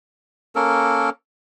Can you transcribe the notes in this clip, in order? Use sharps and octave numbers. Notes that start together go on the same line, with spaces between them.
A#3 C#4 A4 A#4